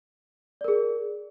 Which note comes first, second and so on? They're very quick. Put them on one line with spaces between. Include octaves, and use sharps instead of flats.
D5 A#4 G#4